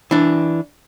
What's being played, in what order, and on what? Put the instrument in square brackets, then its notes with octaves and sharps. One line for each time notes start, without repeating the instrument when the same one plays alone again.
[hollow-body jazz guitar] E3 D4